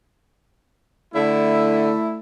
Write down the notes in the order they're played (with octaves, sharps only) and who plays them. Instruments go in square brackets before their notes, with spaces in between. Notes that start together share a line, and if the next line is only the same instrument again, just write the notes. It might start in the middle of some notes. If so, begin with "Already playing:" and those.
[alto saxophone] D3 [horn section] A3 E4